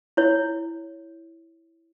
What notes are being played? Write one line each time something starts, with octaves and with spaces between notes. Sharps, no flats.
E4 C#5